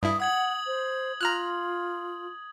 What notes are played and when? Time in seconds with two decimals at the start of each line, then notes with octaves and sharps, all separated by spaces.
0.03 G2 E4 D#6
0.20 F#5 D#6 G#6 F#7
0.66 C5
1.21 F4 A#5 F6 F#6